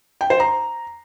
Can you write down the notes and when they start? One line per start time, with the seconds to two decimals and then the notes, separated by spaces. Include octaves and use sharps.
0.21 G5
0.30 C5
0.40 A#5